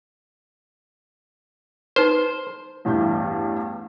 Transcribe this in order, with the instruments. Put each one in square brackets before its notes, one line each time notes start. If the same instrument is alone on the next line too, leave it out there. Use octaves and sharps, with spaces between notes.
[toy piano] D#4 B4 [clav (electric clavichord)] C5
[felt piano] A1 E2 G2 E4 F5 G6